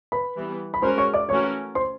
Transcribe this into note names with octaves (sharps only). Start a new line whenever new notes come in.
B4 B5
E3 G3 B3
B5
G#3 C#4 F#4 A#4 C5 C6
C#5 C#6
D5 D6
E3 A3 C#4 F#4 A#4 C#5 C#6
C5 C6